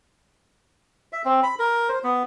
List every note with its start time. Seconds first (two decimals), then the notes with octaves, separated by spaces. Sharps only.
1.13 E5
1.25 C4
1.43 B5
1.59 A#4
1.89 C5
2.04 B3